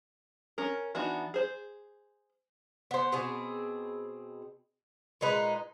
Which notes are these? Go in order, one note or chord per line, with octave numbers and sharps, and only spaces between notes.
C#4 A#4
E3 B3 D4 D#4 F#4
G#4 C5
B3 C5
B2 C4 G#4
A#2 G#3 D#4 B4